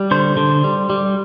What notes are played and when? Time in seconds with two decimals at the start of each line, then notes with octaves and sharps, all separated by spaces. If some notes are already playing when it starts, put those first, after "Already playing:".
Already playing: G3
0.11 D3 C5
0.37 D3
0.64 G3
0.90 G3